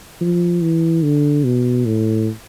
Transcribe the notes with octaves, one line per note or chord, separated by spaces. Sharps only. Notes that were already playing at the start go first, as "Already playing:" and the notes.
F3
E3
D3
B2
A2